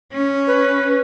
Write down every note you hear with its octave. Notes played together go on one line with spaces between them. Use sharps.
C#4
B4